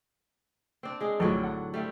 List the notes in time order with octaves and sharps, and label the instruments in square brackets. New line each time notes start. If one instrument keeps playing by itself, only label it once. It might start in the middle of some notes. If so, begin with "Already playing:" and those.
[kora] C4 D4
G#3 G#4
[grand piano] A#1 [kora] A2 D3 F#3
[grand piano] F#5
[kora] G3 A3 C4